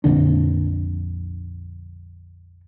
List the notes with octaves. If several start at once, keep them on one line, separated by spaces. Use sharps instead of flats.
A#1 F2 D3 D4